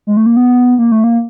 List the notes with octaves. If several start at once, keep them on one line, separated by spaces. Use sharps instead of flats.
G#3
A3
A#3
B3
A#3
A3
A#3